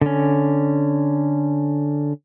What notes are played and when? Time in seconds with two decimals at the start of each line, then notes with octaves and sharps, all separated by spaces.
0.01 D3 C#4